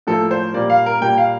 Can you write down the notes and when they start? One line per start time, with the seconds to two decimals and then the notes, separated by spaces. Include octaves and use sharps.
0.07 A2 F3 A#3 A4
0.31 C5
0.54 A#2 G3 A#3 D5
0.70 F5
0.86 A#4
1.01 A#2 G3 A#3 G5
1.17 F5